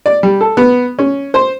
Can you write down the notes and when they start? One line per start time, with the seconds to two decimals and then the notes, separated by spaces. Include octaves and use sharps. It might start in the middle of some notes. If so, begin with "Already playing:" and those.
0.06 D5
0.23 G3
0.41 A4
0.57 B3
0.99 C#4
1.34 C5